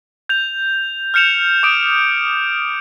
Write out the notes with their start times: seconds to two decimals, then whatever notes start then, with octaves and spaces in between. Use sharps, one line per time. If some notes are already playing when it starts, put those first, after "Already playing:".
0.29 G6 F7
1.14 F6 G6 C#7 E7 F7
1.63 D6 D#6 D7